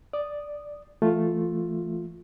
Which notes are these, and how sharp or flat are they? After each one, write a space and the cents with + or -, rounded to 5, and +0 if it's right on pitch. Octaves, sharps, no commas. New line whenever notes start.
D5 +0 D#6 -10
E3 +35 A3 +0 F4 +5